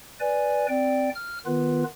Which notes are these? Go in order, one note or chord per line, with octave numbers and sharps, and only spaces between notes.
B4 D5 G#5
C4 D5 G5
F6
D#3 B3 F4 B4